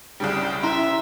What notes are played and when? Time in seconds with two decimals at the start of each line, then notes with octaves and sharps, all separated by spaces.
0.20 C2 C#3 G3 G5
0.63 C#4 E4 E5 A#5 C6 F#6